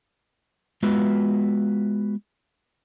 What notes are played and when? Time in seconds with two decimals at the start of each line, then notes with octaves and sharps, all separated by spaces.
0.83 G#3 B3 F4 F#4 B4 E5